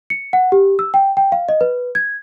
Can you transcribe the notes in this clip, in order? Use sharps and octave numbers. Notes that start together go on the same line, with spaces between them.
C#7
F#5
G4
E6
G5
G5
F5
D#5
B4
G#6